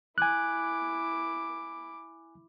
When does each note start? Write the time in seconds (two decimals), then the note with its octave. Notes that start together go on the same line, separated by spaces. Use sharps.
0.18 E4 G#5 D6 F#6